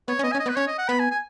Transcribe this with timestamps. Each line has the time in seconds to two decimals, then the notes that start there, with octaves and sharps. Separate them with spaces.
0.08 B3 C#5
0.19 C#4
0.23 B3 D#5
0.32 G#5
0.35 C#4
0.40 D#5
0.46 B3
0.49 B4
0.56 C#4 C#5
0.67 D#5
0.78 F#5
0.89 B3 B5
0.99 G#5
1.11 G#5